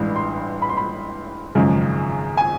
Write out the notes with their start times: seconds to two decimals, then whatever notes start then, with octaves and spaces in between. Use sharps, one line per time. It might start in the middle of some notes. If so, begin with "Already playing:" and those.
Already playing: A1 G2 E3 G#3
0.16 C6
0.62 B5
0.69 C6
0.77 B5
1.55 G#1 F#2 C#3 F3 G#3
2.37 G#5